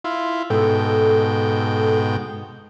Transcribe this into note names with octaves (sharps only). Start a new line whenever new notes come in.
E4 F4
G#2 B2 A4 G5